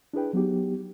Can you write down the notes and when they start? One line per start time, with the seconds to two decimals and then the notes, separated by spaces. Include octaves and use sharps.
0.13 D4 E4 G#4 B4 G5
0.33 F#3 B3 D#4 G4